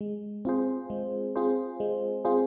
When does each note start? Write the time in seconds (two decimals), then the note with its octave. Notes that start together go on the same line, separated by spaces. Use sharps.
0.01 G#3
0.45 C4 F4 G#4 C5
0.90 G#3
1.36 C4 F4 G#4 C5
1.80 G#3
2.25 C4 F4 G#4 C5